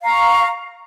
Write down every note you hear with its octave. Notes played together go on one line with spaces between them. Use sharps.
F5 A#5 C#6